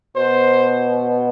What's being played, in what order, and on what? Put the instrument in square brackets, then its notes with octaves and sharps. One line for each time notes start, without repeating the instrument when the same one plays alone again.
[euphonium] B2 [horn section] C5